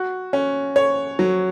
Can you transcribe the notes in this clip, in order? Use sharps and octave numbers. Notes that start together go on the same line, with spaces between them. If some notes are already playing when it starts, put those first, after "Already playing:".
Already playing: F#4
C#4
C#5
F#3